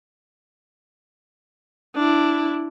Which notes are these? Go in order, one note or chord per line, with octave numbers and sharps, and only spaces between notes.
D4 E4